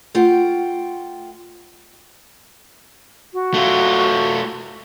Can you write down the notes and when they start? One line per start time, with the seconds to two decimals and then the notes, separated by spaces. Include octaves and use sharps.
0.15 A3 F4 F#5 G5
3.33 F#4
3.54 A3 F4